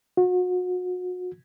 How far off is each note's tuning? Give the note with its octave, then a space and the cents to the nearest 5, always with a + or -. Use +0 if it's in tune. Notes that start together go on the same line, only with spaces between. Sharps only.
F#4 -35